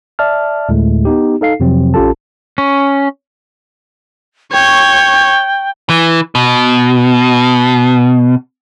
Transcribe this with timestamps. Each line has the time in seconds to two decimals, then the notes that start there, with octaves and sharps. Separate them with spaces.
0.19 D5 E5 A5 F6
0.69 D2 A2 G#3 A3
1.05 B3 D#4 G4
1.41 D#4 A4 F5 C7
1.60 F2 C3 F3 F#3 C4
1.94 A1 C#4 F4 G4 A4 A5
2.58 C#4
4.53 C#5 G5 C#6
5.90 E3
6.35 B2